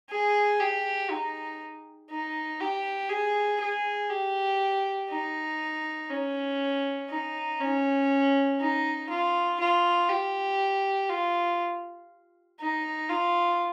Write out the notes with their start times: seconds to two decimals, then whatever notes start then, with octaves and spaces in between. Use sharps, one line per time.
0.11 G#4
0.60 G4
1.10 D#4
2.10 D#4
2.60 G4
3.10 G#4
3.61 G#4
4.10 G4
5.10 D#4
6.10 C#4
7.10 D#4
7.60 C#4
8.60 D#4
9.10 F4
9.60 F4
10.09 G4
11.10 F4
12.60 D#4
13.09 F4